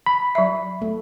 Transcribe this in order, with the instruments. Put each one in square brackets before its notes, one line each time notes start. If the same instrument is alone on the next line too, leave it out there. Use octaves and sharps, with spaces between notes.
[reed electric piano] B5
[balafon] F#3 E5
[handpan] A3